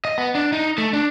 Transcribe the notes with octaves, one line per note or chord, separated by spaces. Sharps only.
D#5
B3
D4
D#4
A3
D4